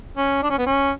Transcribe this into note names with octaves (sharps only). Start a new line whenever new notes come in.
C#4
D4
C#4
B3
C#4